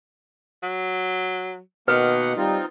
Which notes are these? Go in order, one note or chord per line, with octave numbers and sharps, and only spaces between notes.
F#3
B2 D#3 A#3 B4 F#5
G3 C4 D#4 F4